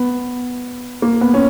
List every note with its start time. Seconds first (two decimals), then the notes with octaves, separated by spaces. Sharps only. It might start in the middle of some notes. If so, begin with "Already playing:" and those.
Already playing: B3
1.02 A#3
1.21 B3
1.34 C#4